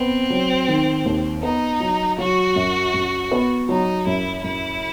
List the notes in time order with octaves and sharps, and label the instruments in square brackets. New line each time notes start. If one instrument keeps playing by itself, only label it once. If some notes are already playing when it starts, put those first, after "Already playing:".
Already playing: [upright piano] B3 [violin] C4
[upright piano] F#3
D#3
D#2
[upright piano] B3 [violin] D#4
[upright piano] F#3
[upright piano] F#3 [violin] F#4
[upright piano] F#2
F#2
B3
[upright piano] F#3 [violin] D#4
[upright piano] F#2 [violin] E4
[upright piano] F#2 [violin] E4